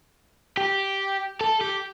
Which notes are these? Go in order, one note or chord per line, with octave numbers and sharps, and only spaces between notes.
G4
A4
G4